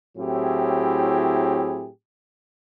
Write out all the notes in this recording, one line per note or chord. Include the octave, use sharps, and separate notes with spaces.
A2 F#3 C4 E4 G4 G#4